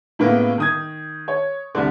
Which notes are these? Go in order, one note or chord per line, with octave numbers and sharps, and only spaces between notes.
A2 C#3 A#3 B3
D#3 D#6 G#6
C#5
C2 D3